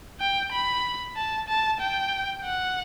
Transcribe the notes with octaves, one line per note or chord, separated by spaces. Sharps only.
G5
B5
A5
A5
G5
F#5